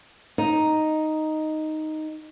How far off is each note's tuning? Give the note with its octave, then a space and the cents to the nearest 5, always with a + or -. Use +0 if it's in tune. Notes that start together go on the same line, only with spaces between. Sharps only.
D#4 +0